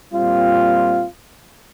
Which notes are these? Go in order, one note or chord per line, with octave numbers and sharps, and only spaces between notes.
A#2 G3 C4 F4